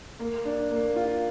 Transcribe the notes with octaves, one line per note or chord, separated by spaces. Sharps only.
A#3
D4
A#3
F4